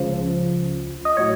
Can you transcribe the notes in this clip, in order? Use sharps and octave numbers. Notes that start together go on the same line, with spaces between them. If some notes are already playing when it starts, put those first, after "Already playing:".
Already playing: C#2 C#3 F3
D#5
A2 F#3 C#5